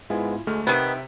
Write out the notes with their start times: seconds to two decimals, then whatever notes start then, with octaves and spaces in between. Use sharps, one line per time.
0.10 G#2 G#3 B3 E4 F4 G#5
0.47 D2 G#3 A3 F6
0.67 C3 D#3 B3 E5 G5 B6